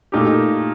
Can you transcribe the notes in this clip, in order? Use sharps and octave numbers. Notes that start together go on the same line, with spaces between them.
A#2 A3 D#4 G4